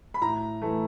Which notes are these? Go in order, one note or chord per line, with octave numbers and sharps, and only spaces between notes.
B5
A2 A#5
E3 A3